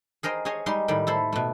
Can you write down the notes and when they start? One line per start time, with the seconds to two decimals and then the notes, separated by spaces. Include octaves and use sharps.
0.23 G#4 A#4 C5 D#5 G5
0.45 G#4 C5 C#5 D#5 G#5
0.66 G3 G#3 D#4 C6
0.88 A2 D#3 G3 G5
1.07 E4 A4 C5
1.33 B2 A3